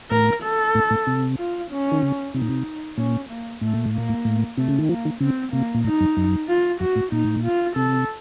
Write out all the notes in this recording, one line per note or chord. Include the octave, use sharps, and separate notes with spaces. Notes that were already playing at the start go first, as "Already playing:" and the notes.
A2 A#4
A4
A2
A2
C3
F4
C#4
D#3
C#3
C3 D#4
A#2
C3
A#2 C#4
A#3
A2 A3
A#2
A2
A#2 A#3
A2
A2
C3 A3
C#3
D#3
F3 A#3
D#3
C#3 C4
C3 A#3
A#2
A2 D#4
F#2
F#2
F4
F#2 F#4
A2
A#2 D#4
A2
A#2
F4
C3 A4